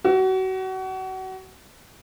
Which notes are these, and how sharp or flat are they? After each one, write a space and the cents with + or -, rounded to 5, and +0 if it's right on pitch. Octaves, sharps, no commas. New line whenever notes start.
F#4 +30